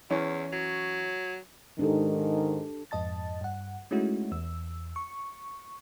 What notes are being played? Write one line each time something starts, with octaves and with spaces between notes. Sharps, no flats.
E2 E3 C#4
F#3
G#2 D#3 D4 G4 A4
F2 G#2 D#5 A5 A6
G2 F#5
G#3 A3 C#4 D#4 E4 F#4
E2 E6
C#6